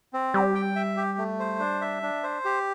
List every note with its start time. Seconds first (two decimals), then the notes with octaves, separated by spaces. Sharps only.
0.13 C4
0.34 G3 G4
0.55 G5
0.76 E5
0.97 G4
1.18 A3
1.39 C5
1.60 D4
1.81 E5
2.03 D4
2.23 C5
2.45 G4